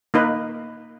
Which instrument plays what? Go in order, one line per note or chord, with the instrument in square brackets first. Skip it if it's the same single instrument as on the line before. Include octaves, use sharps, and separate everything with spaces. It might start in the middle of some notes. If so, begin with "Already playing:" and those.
[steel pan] A#3 D#4 B4